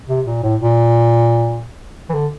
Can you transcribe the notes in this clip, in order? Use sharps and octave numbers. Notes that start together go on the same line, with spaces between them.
C3
A#2
A2
A#2
E3
D3